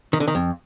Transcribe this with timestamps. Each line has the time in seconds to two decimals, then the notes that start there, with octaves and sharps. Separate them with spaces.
0.13 D#3
0.20 D3
0.28 D#3
0.35 F2